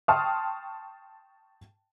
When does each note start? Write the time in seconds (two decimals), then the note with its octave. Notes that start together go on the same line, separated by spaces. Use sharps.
0.08 G5 A5 C6 C#6 D#6 F6